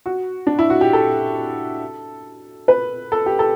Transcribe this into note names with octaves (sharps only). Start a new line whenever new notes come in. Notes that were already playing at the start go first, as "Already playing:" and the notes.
F#4
D4
E4
F#4
G4
A4
B4
A4
G4
A4